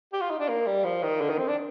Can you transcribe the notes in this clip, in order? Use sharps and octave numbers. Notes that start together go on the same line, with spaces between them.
G4
F4
D#4
D4
A#3
G3
F3
D#3
D3
D#3
C4
D4